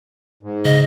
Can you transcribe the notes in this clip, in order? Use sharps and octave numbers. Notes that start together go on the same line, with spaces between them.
G#2
C#3 D#5